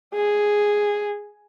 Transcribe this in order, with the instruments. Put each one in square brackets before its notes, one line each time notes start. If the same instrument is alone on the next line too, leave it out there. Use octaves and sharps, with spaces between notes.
[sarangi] G#4